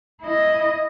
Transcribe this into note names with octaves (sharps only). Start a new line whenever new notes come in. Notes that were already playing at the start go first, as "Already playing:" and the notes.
E4 D#5